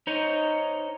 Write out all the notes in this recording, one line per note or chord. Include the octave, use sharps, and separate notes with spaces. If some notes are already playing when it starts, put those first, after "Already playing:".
D#4 C5 C#5 D#5